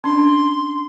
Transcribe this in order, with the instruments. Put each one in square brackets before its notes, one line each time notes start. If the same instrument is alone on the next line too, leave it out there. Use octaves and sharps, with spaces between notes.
[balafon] C#4 D4 [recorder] C6